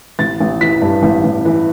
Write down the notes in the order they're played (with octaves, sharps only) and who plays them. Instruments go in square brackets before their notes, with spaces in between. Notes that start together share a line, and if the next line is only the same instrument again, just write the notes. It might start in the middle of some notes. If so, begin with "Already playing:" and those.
[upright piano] A1 A6
A1
E3 B6
G2
A1
A1
E3